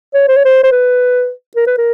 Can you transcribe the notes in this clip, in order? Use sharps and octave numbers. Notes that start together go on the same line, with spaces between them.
C#5
C5
C#5
C5
C5
B4
A#4
B4
A#4